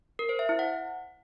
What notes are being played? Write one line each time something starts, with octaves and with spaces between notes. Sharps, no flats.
A#4
C5
E5
E4
F#5